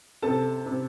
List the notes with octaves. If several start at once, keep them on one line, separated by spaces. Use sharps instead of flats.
C3 A4 A5
C3